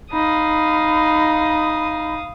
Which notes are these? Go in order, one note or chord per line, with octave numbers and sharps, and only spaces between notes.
D#4 F5 B5 D#6